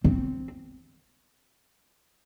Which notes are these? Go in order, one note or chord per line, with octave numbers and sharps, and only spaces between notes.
C4